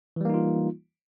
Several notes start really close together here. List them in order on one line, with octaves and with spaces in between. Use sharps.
E3 G3 A#3 D#4 F4